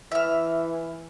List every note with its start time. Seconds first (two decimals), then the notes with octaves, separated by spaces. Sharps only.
0.12 E3 E5 F6